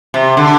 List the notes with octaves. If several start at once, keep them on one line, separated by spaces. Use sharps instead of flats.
C3
D3